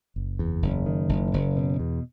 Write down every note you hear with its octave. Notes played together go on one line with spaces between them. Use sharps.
F#1
E2
F#1
D#3
F#1
F#1
B2
E2